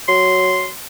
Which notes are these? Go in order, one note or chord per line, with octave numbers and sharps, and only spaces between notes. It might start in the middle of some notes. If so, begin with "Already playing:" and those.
F#3 C6